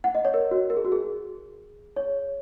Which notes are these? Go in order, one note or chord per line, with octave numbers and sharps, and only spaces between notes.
F#5
D#5
C#5
A#4
F#4
A#4
G#4
F#4
G#4
C#5